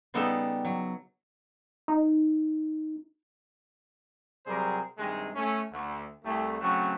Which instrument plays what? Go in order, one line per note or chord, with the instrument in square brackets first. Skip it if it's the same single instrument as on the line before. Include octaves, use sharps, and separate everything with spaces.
[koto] C#3 G3 B3 D#4 A4
F#3
[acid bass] D#4
[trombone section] C3 F#3 G3 G#4 A#4 C5
G2 C3 D#3 G#3
A3 C#4
D2
C2 A3
C#3 F#3 A3 C4 C#4 F#4